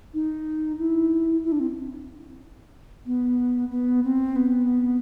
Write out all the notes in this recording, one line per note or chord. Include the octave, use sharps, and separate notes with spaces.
D#4
E4
E4
D4
C4
B3
B3
C4
B3